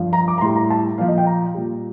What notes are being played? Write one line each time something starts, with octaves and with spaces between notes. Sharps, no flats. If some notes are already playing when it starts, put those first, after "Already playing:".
Already playing: G2 F3
A#5
D6
A#5
A2 G3 C6
A#5
A5
A#2 F3 F5
D#5
G5
A#5
A#2 G3